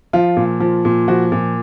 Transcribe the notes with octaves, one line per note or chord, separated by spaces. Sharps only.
F3 F4
A#2
F3
A#2
F3 F#4
A#2